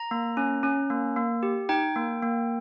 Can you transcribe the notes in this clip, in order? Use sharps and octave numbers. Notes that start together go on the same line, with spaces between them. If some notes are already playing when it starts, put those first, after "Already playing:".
Already playing: A#5
A#3
C#4
C#4
A#3
A#3
G4
D#4 G5
A#3
A#3